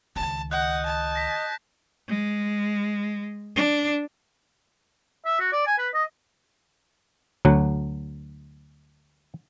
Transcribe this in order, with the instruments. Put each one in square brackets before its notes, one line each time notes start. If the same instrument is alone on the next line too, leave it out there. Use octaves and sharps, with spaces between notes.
[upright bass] C#2 D#3 [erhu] A5
[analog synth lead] D#5 [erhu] F#5 [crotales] F#6 G6
[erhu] A5
[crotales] A#6 B6
[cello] G#3
D4
[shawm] E5
F#4
D5
G#5
B4
D#5
[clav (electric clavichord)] D2 F#3 F#5